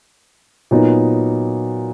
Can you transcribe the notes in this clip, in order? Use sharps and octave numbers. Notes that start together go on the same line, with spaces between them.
A#2 F#3 B3 D#4